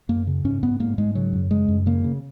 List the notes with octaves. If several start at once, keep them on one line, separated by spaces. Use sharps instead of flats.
F#2 A#3
C#3
G#2 C#4
G#2 B3
G#2 A#3
G#2 G#3
C#3 F#3
F#2
C#3 G#3
F#2
C#3 A#3
C#3